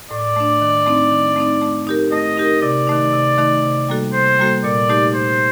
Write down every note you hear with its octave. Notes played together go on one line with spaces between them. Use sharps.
A2 D5
A3 D4
D#3
A3 C4 D#4
D#3
A3 C4 D#4
A3
D#4 G4 A#4
A3 D#5
D#4 G4 A#4
C3 D5
D#3 A3 D#4
C3
D#3 A3 D#4
C3
G3 A#3 F#4 A4
C3 C5
G3 A#3 F#4 A4
A#2 D5
A3 D#4 G4
A#2 C5